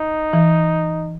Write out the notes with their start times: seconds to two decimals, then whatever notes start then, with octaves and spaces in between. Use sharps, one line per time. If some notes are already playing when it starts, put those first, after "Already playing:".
Already playing: D#4
0.33 E3